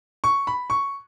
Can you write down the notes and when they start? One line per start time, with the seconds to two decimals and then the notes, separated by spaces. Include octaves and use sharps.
0.24 C#6
0.47 B5
0.70 C#6